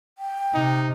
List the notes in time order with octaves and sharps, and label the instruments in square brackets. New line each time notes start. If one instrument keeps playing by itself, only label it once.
[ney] G5
[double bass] C3 [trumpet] D#4